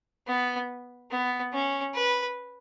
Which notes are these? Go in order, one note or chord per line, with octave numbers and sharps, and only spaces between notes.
B3
B3
C#4
B4